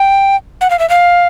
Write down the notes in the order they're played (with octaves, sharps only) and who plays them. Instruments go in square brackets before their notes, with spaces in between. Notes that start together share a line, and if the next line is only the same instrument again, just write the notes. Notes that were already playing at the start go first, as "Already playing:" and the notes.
Already playing: [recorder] G5
F#5
F5
E5
F5